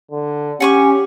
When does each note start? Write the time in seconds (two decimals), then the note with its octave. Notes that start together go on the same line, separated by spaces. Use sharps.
0.11 D3
0.60 C#4 G4 F#5 G#5 C#6